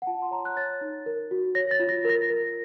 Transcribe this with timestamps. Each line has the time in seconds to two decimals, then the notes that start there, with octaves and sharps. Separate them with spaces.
0.02 F#5
0.07 F4 A5
0.22 C6
0.31 C#5 A#5
0.45 F#6
0.57 C#5 A6
0.81 D#4
1.06 A#4
1.31 F#4
1.55 C#5 A#6
1.71 A6
1.80 F4
1.89 A#6
2.05 A#4 A#6
2.30 A#4